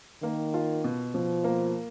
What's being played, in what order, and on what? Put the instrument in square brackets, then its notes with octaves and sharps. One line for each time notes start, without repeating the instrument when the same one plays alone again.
[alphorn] D#3 [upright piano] A#3
[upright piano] F4
B2
[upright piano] B2 [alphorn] F3
[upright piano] A#3